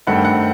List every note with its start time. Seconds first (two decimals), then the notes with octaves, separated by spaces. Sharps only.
0.07 G2 D#3 A3 C4 F#5
0.15 G5
0.25 F#5